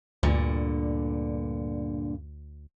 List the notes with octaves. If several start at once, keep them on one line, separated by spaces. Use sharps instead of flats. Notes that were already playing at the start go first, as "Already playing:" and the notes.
D2 G2 A#2 D3